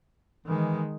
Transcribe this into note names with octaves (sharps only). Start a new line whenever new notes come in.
D#3 E3 G#3